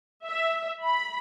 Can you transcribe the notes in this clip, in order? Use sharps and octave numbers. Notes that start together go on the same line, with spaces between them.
E5
B5